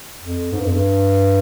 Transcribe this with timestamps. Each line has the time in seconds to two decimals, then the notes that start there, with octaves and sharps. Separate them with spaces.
0.22 F2
0.52 G#2
0.59 G2
0.66 F2
0.74 G2